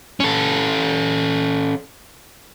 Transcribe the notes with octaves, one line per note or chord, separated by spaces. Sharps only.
C#4 A4